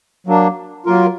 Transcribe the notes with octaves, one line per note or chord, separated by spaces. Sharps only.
F#3 A#3 D4
F#3 A#3 F4 A#4